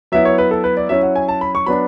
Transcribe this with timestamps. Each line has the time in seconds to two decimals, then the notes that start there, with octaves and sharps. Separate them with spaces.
0.12 F#3 B3 E4 E5
0.25 C#5
0.38 B4
0.51 A4
0.64 B4
0.77 D5
0.89 F#3 C#4 E4 E5
1.03 F#5
1.16 G#5
1.29 A5
1.41 B5
1.55 C#6
1.66 F#3 B3 D4 B5